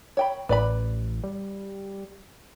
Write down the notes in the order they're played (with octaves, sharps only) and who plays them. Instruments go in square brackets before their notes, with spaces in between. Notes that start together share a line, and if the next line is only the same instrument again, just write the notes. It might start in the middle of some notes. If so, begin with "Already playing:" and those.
[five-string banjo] C#5 G5 B5
[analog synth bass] A1 [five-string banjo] B4 D5 B5
[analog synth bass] G3